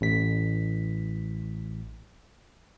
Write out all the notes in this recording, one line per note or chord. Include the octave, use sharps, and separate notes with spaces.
A1 B6